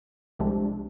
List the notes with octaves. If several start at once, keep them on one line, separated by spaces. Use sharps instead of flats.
C2 C3 F3 G#3 D4